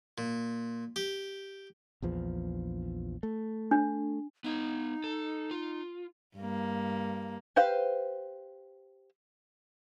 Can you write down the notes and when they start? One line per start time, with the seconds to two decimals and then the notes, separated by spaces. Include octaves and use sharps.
0.18 A#2
0.96 G4
2.02 A#1 E2 F3
3.23 A3
3.71 D4
4.44 B3 D#4 F5
5.04 A4
5.51 F4
6.37 G2 A#3
7.56 G4 B4 C5 F5